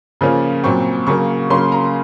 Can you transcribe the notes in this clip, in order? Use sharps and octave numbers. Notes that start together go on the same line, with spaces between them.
C#3 F3 A#3 C#4
A#2 F#3 C4 C#6
C#3 F#3 A#3 C#6
C#3 F#3 A#3 C#4 C6
A#5